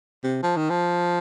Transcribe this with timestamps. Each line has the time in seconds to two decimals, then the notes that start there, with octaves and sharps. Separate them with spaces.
0.24 C3
0.43 F3
0.57 D#3
0.70 F3